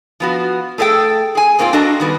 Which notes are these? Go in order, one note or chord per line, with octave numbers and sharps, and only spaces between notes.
F3 B3 F#4
A3 G#4 A4 D#5 G5
G#4 G#5
G#2 A#3 C4 F4 G5
D4 F#4 A4 D#5 A5 A#5
D#3 G3 B3